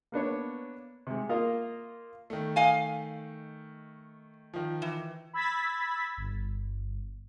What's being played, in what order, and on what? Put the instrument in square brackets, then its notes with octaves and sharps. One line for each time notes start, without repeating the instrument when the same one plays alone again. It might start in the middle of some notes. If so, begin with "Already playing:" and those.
[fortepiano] A#3 B3 D4 C#5
C3 G#3
A#3 F4 A#4 D#5 F5
[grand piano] D#3 A3
[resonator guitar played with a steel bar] D#5 F5 G#5
[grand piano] D#3 F3
[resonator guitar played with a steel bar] E3
[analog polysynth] B5 E6 G#6 A6 B6
G1